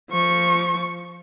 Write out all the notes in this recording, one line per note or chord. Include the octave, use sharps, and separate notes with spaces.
F3 C#6